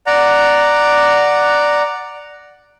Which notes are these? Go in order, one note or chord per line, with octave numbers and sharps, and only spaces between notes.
D5 F#5 A#5